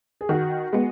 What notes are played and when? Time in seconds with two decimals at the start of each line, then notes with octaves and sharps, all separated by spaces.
0.21 G#4
0.29 D#3 F#4
0.73 G#3 B3